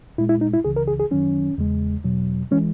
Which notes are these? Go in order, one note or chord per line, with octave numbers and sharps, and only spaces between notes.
A#2 G#3 E4
E4
D#4
E4
C#2 C#3 E3 G#4
A#4
G#4
G#4
F#2 D#3 F#3 C#4
E2 C#3 G#3
E2 B2 F#3
E3 G#3 C#4